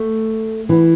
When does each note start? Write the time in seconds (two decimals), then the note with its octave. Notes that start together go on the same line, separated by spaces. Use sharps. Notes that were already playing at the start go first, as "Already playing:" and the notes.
Already playing: A3
0.69 E3